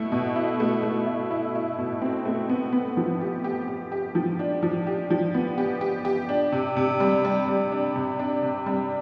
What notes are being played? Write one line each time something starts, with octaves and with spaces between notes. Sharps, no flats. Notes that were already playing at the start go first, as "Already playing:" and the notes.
Already playing: B2 A3 E4
B2
E4
A3
A3
E4
E4
E4
B2
C4
A3
B3
B3
F3
G4
G4
G4
G4
F3
D4
F3
G4
F3
B3
G4
G4
G4
D4
C3
C3
G3
G3
G3
D4
C3
D4
C3
G3